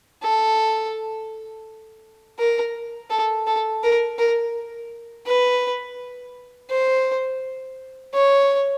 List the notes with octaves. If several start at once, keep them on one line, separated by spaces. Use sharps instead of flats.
A4
A#4
A4
A4
A#4
A#4
B4
C5
C#5